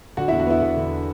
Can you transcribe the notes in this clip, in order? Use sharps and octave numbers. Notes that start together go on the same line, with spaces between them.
D3 F#4 F#5
E2 E4 E5
F#4 F#5
B3 E4 E5
E2
D3